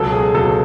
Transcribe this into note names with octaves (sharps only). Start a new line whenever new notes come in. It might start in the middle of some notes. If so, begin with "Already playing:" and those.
Already playing: C#2 B2 F#3 A4
G#4
C#2 B2 F#3 A4